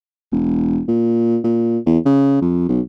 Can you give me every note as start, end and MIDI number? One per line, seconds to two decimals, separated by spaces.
0.32 0.81 28
0.88 1.38 46
1.44 1.78 46
1.86 1.98 40
2.05 2.37 49
2.41 2.67 41
2.69 2.80 35